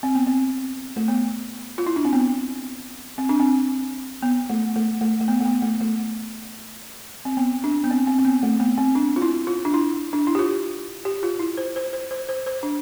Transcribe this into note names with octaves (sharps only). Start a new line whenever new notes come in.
C4
B3
C4
A3
B3
F4
E4
D4
C4
B3
C4
D4
C4
B3
A3
A3
A3
A3
B3
A3
B3
A3
A3
C4
B3
D4
B3
C4
C4
C4
B3
A3
B3
C4
D4
F4
E4
F4
D4
E4
D4
E4
G4
F4
G4
F4
E4
C5
C5
C5
C5
C5
C5
D4